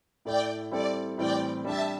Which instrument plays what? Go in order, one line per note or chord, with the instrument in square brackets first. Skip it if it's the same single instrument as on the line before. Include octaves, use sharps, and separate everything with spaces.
[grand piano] A2 A3 E4 [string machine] D5 G5
[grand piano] G3 C4 E4 A4 [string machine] D5
[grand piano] A2 E3 G3 C4 G4 [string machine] D5 G5
[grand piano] G3 D4 G4 [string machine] E5 A5